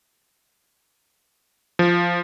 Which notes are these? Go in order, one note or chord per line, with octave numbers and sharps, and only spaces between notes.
F3